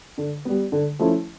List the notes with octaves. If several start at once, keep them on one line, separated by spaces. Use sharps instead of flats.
D3
G3 B3
D3
F3 A3 C#4 E4